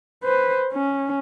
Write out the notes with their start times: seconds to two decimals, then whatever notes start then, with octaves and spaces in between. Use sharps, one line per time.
0.24 B4 C5
0.72 C#4